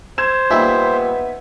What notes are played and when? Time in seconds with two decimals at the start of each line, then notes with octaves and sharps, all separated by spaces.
0.18 C5 G#6 E7
0.51 A#2 G3 B3 D#4 E4 E5